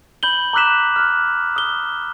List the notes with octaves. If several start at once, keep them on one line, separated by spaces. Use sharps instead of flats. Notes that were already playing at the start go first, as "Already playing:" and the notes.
B5 G6 F#7 G7
A#5 D6 E6 F#6 B6 E7
F6 F#6
D#6 G7